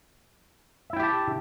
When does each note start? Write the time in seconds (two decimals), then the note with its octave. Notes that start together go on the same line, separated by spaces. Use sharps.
0.90 E5
0.93 E4
0.96 G5
1.00 G4
1.03 A5